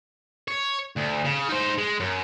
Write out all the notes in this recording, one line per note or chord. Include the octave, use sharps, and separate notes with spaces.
C#5
D2
C#3
D#4 C5
G#3
F#2